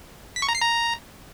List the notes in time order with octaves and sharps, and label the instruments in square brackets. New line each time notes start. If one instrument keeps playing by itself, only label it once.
[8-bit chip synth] B6
C#6
A#5
C7
A#5